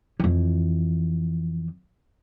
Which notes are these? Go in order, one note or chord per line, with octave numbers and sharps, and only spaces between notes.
F2 E3